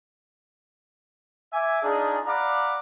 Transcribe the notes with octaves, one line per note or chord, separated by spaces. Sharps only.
E5 G#5 D6
D4 D#4 F4 G#4
D5 F5 F#5 A#5 B5 D6